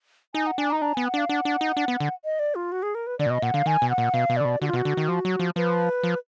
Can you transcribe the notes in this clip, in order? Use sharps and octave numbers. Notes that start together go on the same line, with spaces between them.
D#4 G#5
F#5
D4 G#5
D#4 A#5
D4 A#5
B3 G#5
F#5
D4 F5
D4 F#5
D4
D#4
D4
B3
D3
D#5
D5
F4
F#4
G#4
A#4
B4
D3 D5
A#2
B2 D#5
A#2 F#5
D3 F5
D#3 G#5
B2
F#5
A#2
B2 F5
B2
D3 D5
B2
D3 F#4
F4
B2 F#4
D3
D#3
F3
F#3
F3
F3 B4
F3